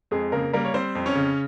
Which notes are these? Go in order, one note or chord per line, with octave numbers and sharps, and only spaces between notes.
F2 G#3 G#4
C#3 A#3 A#4
G3 A#3 A#4
C#5
G3 C4 C5
F2
C#4 C#5
C#3